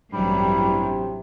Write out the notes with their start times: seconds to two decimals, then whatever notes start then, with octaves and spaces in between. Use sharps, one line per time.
0.13 A1 G2 C3 E3 F#3 G3